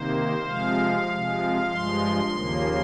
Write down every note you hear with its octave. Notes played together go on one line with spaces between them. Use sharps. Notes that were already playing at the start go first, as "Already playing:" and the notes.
Already playing: C3 D#3 A#3 C5
C3 F3 G#3 F5
C3 F3 G#3
G2 F3 G#3 C6
D#2 C#3 F3 A#3